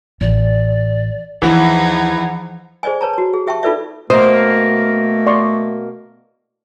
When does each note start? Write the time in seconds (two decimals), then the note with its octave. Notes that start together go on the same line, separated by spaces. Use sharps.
0.21 A1 D5
1.42 D#2 E3 F3 D#4 G#4 F#5
2.83 G#4 C5 D5 D#5 G#5
3.01 B4 C#5 A5 A#5
3.13 F#4 C#5
3.33 G#4
3.47 G4 E5 G5 A5 C#6
3.63 D#4 F4 A4 B4 D5 E5
4.10 B2 A3 A#3 C5 D#6
5.26 D5 C6 C#6